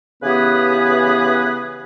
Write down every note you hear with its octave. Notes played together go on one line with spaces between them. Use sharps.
C#3 E3 B3 G4 G#4 B4